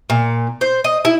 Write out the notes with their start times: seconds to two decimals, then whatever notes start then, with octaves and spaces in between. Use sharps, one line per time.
0.10 A#2
0.61 C5
0.84 D#5
1.05 E4